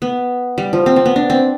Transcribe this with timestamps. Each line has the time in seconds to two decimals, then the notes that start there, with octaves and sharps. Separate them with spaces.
0.02 B3
0.58 G3
0.73 F3
0.86 C4
0.96 C4
1.06 B3
1.16 D4
1.30 C4